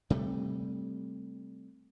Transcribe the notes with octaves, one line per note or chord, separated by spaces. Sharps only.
C3 G3 A3